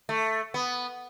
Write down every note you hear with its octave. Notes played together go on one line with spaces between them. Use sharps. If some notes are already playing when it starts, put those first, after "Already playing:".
A3
B3